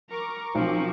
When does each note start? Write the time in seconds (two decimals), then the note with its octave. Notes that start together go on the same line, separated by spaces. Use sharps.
0.10 A#4 A#5 C#6 D6
0.55 B1 F3 C4